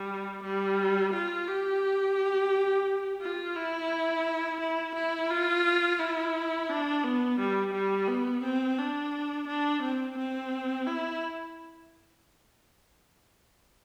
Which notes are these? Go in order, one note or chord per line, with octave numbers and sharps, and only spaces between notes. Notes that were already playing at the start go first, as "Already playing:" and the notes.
Already playing: G3
G3
F4
G4
F4
E4
E4
E4
F4
E4
D4
B3
G3
G3
B3
C4
D4
D4
C4
C4
E4